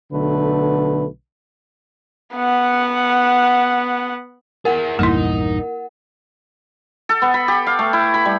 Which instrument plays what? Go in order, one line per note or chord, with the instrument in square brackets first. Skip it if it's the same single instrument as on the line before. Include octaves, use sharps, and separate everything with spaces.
[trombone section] B1 D3 A3 B4
[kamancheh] B3 F#5
[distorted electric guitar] E4 G#4 [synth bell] A#4 F#5
[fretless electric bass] A#1 E2 G2 [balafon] A#3 E4 [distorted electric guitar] D#4
[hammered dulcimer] A4
B3
B5
G4
F5
A3
E4
B5
G3